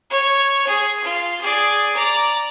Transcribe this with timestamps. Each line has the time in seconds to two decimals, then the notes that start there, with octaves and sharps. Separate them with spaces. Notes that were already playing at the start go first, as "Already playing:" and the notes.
0.10 C#5
0.66 G#4
1.04 F4
1.41 G#4 D5
1.95 D5 A#5